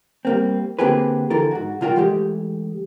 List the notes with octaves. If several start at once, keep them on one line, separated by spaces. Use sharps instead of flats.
G3 A#3 C4
D3 A#3 C4 G4 G#4 B4
D3 E3 A4 A#4
G#2 F#4
C2 A#2 F4 F#4 A#4 G5
E3 G#3 A3 G4